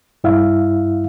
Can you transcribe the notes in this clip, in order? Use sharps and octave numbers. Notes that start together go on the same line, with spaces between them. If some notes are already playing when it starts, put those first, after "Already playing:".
G2 E4 E5 F5